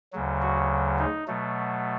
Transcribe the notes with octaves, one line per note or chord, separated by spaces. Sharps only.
D2 C#3 F#3
F#4
D#4
B2 F#3 A3